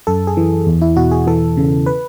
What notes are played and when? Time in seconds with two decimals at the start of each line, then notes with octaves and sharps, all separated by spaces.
0.07 F#2 A4
0.27 G#4
0.37 E3
0.67 E2
0.82 E4
0.97 B2 F#4
1.12 G#4
1.27 E3 A4
1.57 C#3
1.86 B4